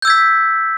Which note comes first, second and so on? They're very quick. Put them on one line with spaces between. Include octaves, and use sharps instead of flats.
G6 E6 G#6 B6